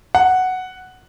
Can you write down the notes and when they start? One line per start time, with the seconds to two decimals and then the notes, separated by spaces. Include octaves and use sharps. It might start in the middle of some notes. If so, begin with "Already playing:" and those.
0.15 F#5